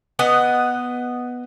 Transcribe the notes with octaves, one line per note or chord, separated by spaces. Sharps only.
B3 D#5 F#5